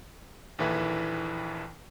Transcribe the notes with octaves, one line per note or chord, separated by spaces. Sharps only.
A#1 D#2 E3 E4 A4 B4